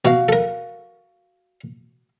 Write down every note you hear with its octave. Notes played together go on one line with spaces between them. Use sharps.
B2 F#4 F5
A4 A#4